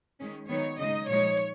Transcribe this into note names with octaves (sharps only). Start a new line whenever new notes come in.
D#3 G#3 C#4
D#3 F#3 B3 D#4 C#5
C#3 G#3 D#4 D#5
A#2 F3 G#3 D#4 C#5